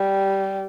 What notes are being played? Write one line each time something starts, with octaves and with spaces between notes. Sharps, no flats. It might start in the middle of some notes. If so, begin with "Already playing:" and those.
Already playing: G3